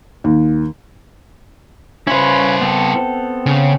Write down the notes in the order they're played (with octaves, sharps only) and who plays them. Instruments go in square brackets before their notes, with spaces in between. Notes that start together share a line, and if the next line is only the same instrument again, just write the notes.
[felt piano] D#2
[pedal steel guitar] C#4 F4 B4 [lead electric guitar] E4 C5
[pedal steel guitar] B3 C4 A4
[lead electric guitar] C#3